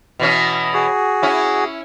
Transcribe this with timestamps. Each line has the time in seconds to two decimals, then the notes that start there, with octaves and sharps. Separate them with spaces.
0.19 B2 E3 C#4
0.74 F#4 G#4
1.23 C#4 E4